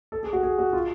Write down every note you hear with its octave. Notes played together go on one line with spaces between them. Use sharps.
A4
G#4
F#4
G#4
F#4
F4